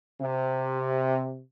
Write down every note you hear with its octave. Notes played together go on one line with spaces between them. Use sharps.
C3